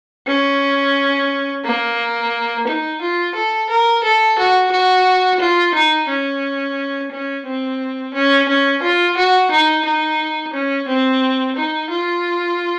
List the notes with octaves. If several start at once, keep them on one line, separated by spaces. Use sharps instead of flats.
C#4
A#3
D#4
F4
A4
A#4
A4
F#4
F#4
F4
D#4
C#4
C#4
C4
C#4
C#4
F4
F#4
D#4
D#4
C#4
C4
D#4
F4